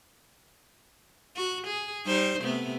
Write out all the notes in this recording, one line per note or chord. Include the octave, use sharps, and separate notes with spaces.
F#4
G#4
G3 D#4 C5
C3 A3 B3